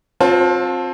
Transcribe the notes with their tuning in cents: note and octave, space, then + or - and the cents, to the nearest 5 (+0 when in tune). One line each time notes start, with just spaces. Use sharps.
C4 +20 F4 +35 A5 -5